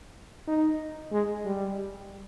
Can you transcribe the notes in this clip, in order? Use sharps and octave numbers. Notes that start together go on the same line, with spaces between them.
D#4
G#3
G3